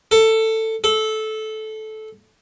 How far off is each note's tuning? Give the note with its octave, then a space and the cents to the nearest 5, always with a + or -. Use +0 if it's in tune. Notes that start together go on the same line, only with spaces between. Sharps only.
A4 +15
A4 -15